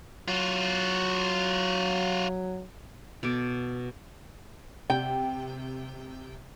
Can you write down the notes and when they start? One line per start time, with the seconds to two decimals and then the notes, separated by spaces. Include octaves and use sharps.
0.28 F#3 F4 F#4
3.23 B2 A4 D6
4.90 C3 G5